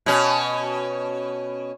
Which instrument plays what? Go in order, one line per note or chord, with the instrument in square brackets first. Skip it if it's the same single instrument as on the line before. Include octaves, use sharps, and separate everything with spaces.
[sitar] B2 C#4